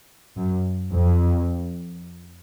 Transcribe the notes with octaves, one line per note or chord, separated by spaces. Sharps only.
F#2
F2